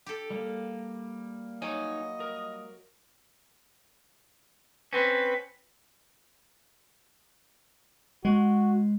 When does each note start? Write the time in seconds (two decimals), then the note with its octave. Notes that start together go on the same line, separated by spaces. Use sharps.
0.06 G4 A4
0.30 G3 A#3
1.62 F#3 D#4 C#5 D#5 G#5
2.20 A#4
4.93 C4 C#4 B4
8.25 G#3 F#4